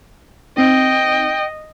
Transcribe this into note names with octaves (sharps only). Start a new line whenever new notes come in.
C4 D#4 D#5 G5